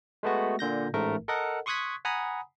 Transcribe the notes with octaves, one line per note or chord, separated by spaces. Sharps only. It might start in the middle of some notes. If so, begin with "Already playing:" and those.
G#3 A3 B3 F#4
A#2 D3 G6 A#6
A1 G#2 A3 A#4
A4 A#4 D#5 F#5
C6 C#6 D#6 F#6 G#6 B6
F#5 G#5 A#5 B5 D#6